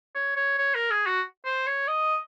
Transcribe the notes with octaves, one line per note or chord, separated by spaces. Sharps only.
C#5
C#5
C#5
A#4
G#4
F#4
C5
C#5
D#5